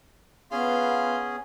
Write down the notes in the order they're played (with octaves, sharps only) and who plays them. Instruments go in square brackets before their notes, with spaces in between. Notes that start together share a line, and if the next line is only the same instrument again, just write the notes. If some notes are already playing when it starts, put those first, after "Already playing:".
[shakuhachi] B3 [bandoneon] C#4 G#4 [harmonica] F4